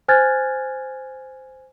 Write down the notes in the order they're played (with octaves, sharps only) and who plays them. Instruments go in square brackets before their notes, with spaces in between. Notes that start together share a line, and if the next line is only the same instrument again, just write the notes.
[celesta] C5 G#5 F6 F#6 G#6 A6